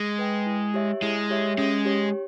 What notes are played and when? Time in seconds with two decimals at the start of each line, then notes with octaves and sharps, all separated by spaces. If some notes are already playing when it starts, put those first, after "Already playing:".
Already playing: G#3
0.19 B4 G5
0.46 E4
0.74 G4 C#5 E5
1.02 G#3 E4
1.30 G4 C#5 E5
1.58 G#3 C#4
1.85 G4 C#5